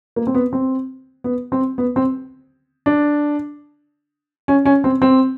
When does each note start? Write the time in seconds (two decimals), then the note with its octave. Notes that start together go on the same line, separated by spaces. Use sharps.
0.16 A#3
0.27 C4
0.35 B3
0.53 C4
1.24 B3
1.52 C4
1.78 B3
1.96 C4
2.86 D4
4.48 C#4
4.65 C#4
4.84 C4
5.02 C4